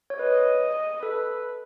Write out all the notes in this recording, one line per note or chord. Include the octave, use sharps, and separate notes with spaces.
C#5
B4 D#5
A4 B4